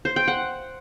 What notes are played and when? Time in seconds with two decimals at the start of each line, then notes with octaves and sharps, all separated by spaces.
0.05 C5
0.16 G5
0.28 F#5